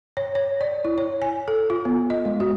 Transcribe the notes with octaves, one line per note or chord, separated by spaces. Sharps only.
C#5
C#5
D5
E4
C#5
G#5
A4
F4
B3
D#5
G#3
F#4